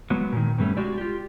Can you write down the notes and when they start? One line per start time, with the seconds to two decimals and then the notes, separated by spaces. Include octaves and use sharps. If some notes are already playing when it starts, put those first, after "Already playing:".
0.10 F#3 G#3 B3
0.32 A#2 D#3
0.58 G2 B2 G3 A3 C#4
0.77 G#3 F#4 G4 D5
0.98 F4 G4